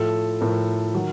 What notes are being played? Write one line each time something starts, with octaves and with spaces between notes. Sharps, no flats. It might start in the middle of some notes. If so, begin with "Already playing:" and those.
Already playing: A2 F3 A4
A2 F3 A#4
D#3 F#3